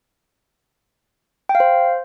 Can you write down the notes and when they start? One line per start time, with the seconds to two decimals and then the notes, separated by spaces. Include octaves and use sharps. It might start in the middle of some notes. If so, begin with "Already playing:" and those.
1.49 G5
1.55 F5
1.60 C5